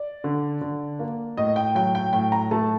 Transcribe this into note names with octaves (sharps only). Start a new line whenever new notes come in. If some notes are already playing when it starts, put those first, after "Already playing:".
Already playing: D5
D3
D3
A#3
A2 D#5
G5
F#3 G5
G5
A2 G5
A#5
A3 A5